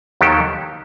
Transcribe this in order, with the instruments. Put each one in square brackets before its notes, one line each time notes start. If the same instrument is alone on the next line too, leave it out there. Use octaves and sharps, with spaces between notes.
[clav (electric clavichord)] D#2 D#3 F#3 G4 A4